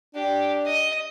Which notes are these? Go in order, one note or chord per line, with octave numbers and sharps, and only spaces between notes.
D4 G4
D#5